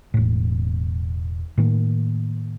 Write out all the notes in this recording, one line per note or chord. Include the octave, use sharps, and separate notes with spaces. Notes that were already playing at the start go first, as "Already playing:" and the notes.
E1 A2
A2 D#3 A#3